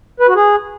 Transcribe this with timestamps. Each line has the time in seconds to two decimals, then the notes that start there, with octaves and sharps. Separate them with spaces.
0.20 B4
0.28 F#4
0.36 G#4